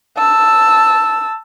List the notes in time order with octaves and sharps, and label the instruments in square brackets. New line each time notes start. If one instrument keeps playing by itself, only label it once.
[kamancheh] A5 E6